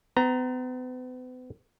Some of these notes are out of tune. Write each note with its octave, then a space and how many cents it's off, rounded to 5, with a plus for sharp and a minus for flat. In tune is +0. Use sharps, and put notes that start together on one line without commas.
B3 +40 A#5 +0